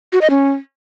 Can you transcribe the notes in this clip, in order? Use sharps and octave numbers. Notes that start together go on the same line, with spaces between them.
F#4
D#5
C#4